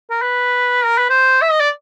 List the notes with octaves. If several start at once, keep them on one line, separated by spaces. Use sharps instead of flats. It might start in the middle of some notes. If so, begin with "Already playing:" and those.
A#4
B4
A#4
B4
C5
E5
D#5
D5